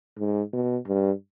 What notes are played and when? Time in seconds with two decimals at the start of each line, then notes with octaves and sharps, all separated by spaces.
0.18 G#2
0.53 B2
0.87 G2